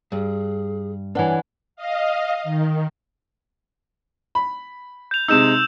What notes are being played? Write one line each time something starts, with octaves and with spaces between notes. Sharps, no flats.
G2 G#4
E3 D4 B4 C#5 F#5 G#5
D#5 F5
D#3
B5
G6 F7
C3 G#3 D#4 E6 G6 E7